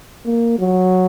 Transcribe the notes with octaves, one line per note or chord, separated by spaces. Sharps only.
A#3
F#3